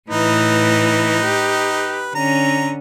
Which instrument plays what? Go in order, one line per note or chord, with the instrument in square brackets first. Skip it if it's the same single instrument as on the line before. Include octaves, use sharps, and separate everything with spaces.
[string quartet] A2 E3 [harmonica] D#4 B4
[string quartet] G4
[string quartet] D3 C#4 [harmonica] A#5